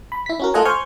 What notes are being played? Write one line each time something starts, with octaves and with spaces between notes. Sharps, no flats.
B5
E4 B6
C#4 F#4 A#4
A3 F4 A4 D#5 F#5 G#5
C5 G#5 C#6 F6 G6 G#6